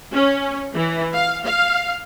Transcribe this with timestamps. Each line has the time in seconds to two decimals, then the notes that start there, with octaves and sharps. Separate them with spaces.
0.13 C#4
0.73 E3
1.14 F5
1.44 F5